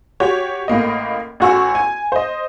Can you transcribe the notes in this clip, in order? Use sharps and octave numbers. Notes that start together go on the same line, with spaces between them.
F#4 G4 C#5
A1 A2 A#3 D#5
A1 C#4 F#4 C#6 E6
G#5
C5 D#5